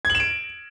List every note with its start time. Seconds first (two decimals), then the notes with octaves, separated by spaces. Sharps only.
0.05 G#6
0.10 F#7
0.15 E7
0.20 D7